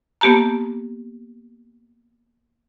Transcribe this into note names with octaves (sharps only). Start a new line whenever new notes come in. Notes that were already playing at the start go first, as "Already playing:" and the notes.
A#3 B3 G4 A5 A#5